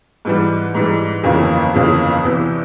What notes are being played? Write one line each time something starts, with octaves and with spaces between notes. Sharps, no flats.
G#2 E3 G3
G#2 E3 G3
G1 F2 C#3 E3 A#3
G1 F2 C#3 E3 A#3
E2 C3 E3